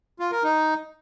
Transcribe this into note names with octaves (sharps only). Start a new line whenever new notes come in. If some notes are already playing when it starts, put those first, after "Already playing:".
F4
A#4
D#4